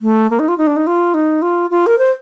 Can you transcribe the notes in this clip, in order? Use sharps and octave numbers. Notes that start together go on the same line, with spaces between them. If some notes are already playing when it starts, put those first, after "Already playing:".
A3
A#3
D#4
F4
D#4
D4
D#4
F4
D#4
F4
F4
A#4
C5